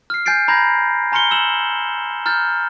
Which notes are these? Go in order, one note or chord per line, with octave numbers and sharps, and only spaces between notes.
F6 C7
G#5 G6 A6 C7 D7
A#5 B5 G6 G#6 A#6
G#5 A#5 C6 F6 C#7 G7
E6 E7 F#7
A#5 F6 G6 A6